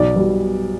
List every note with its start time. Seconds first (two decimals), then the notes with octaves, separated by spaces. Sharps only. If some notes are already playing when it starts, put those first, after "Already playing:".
Already playing: B1 D5
0.16 B2 G3